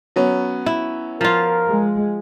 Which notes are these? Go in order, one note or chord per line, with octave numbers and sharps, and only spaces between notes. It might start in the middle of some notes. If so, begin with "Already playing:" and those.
F#3 B3 C#4
E4
F3 F4 A#4
G#3